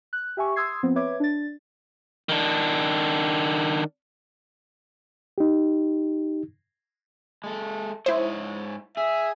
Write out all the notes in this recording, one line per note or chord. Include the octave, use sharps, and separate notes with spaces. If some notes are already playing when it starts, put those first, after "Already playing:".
F#6
G4 E5 G#5 C#6
C6 D#6 E6 G#6 C7
F3 B3 C4
B4 C#5 E5 D6 G#6
D4 A6
D#3 D4
D#4 G4
G#3 A4
G#2 E4 C5 C#5 D#5
G#4 E5